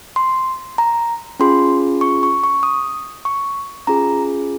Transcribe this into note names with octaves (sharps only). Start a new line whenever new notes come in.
C6
A#5
C#4 F4 G#4 C6
C#6
C#6
C#6
D#6
C#6
C#4 F4 G#4 A#5